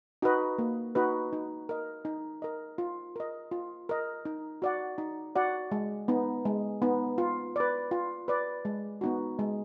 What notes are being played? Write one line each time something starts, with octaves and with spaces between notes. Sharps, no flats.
D#4 F#4 B4 D#5
A#3
D#4 F#4 B4 D#5
D#4
A#4 D#5
D#4
A#4 D#5
F4
A#4 D#5
F4
A#4 D#5
D#4
F#4 D5 F#5
D#4
F#4 D5 F#5
G#3
B3 D#4
G#3
B3 D#4
F4
B4 D5
F4
B4 D5
G#3
B3 D#4 F#4
G#3